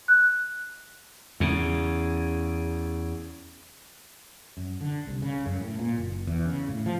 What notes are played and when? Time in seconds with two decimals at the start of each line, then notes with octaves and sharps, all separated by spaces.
0.08 F#6
1.40 E2 C#3
4.57 F#2
4.81 D3
5.07 C2
5.22 C#3
5.46 F#2
5.61 A2
5.79 A#2
5.98 F#1
6.27 E2
6.46 C#3
6.68 A2
6.86 F3